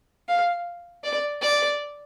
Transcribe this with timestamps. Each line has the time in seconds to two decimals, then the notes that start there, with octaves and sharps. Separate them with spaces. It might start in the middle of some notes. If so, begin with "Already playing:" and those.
0.29 F5
1.04 D5
1.42 D5